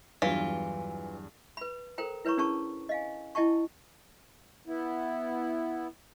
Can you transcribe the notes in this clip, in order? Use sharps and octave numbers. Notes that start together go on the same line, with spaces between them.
E2 G2 E3 F#3 F4
B4 B5
A4 A#4 C5 G5 A#5
E4 B4 C#5 A#5 C#6
C#4 D4 G#4 A#4 A5 C#6
D#5 F5 G#5
E4 D#5 G5 A5 C#6
B3 E4